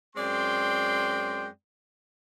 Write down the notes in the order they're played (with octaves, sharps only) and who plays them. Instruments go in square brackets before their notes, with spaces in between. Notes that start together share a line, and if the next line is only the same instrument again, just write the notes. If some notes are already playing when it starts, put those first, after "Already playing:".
[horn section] F#2 G#3 C4 D5 G5 C6